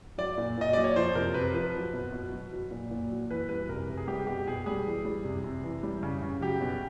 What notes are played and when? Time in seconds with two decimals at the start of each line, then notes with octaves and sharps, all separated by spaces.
0.18 F#3 D5
0.38 A#2
0.58 A#2 D#5
0.73 F#3 D5
0.84 C#5
0.96 F3 C5
1.15 C3 A#4
1.34 C3 B4
1.54 F3 B4
1.74 F#3
1.93 B2
2.12 B2
2.32 F#3
2.52 F#3
2.71 A#2
2.91 A#2
3.11 F#3
3.31 E3 B4
3.49 G3 B4
3.69 C3 A#4
3.88 C3
3.97 G#4
4.07 G3 G4
4.27 B2 G4
4.47 B2 G#4
4.66 G3 G#4
4.86 E3
5.05 G3
5.25 C3
5.44 C3
5.63 E3
5.83 G3
6.03 C#3
6.22 C#3
6.41 F#3 G4
6.61 B2